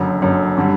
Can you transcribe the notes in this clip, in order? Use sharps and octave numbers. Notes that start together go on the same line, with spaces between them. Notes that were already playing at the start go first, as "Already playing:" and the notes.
Already playing: F#1 F#2 D3
F#1 F#2 D3
D3 G3